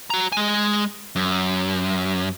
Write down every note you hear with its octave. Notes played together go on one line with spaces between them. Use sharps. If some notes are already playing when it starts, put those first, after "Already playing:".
F#4 A#5
G#3 G#5
F#2